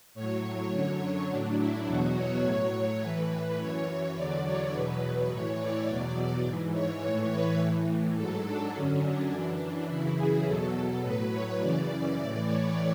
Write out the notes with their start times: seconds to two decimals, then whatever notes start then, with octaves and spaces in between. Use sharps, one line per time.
0.14 A2 F#3 C#5
0.72 F#2 D3 F#3
1.29 A2 F#3 D4
1.58 E4
1.86 E2 B2 F#3 F#4
2.16 C#5
2.43 A2 F#3 C#5
3.01 A2 E3 B4
3.58 F#2 E3 C#5
4.16 E2 D3 F#3 D5
4.44 C#5
4.72 E2 B2 F#3 B4
5.30 A2 E3 C#5
5.59 D5
5.87 E2 B2 F#3
6.44 G#2 E3
6.73 C#5
7.01 A2 E3 C#5
7.31 B4
7.59 A2 E3
8.16 G#2 F#3 A4
8.45 D4
8.73 F#2 D3 F#3 C#4
9.03 D4
9.31 F#2 E3
9.88 F#2 C#3 E3 E4
10.17 G#4
10.45 E2 B2 F#3 A4
11.02 A2 F#3 B4
11.32 C#5
11.60 F#2 C#3 E3 D5
12.17 A2 E3 D5
12.45 C#5